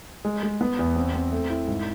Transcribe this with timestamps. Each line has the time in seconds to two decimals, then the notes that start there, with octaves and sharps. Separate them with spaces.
0.25 G#3
0.43 G#3
0.61 B3
0.79 E2
0.96 C4
1.14 C4
1.32 A3
1.50 E4
1.68 G#2